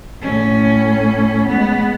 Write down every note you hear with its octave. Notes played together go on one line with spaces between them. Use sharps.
A2 C#4
G#3 B3